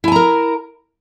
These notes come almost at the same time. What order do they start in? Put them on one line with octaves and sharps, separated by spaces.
E4 G#5 A#5 A#4